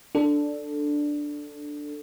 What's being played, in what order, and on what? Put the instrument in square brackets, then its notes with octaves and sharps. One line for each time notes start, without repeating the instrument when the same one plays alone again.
[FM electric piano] D4 A4